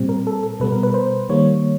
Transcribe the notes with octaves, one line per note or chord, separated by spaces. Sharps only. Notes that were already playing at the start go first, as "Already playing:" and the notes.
Already playing: A#2 G3 C4
A#4
A4
A4
B2 G3 B3 B4
A#4
B4
C5
D#3 G3 A#3 C#5